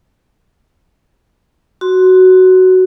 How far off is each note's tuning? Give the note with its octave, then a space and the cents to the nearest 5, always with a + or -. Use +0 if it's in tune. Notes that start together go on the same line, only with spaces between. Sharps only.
F#4 +10 C6 +0